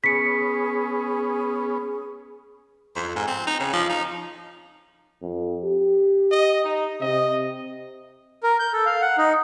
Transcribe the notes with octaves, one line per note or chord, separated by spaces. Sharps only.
B3 C#4 G#4 B6 C#7
F2
G#2
C4
D#4
C#3
F3
D#4
F2
G4
D#5
D#4
C3 D#5
A#4
G6
A4
F5
F#5
D#4